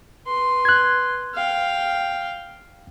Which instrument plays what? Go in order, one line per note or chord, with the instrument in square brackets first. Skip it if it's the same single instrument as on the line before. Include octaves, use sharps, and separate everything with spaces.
[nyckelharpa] B4 C6
[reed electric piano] F#6 G#6
[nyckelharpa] F5 G5